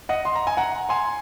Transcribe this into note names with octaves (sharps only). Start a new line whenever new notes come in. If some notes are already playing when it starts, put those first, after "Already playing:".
D#5 F#5
C6
A#5
G#5
F#5 A#5
G#5 C6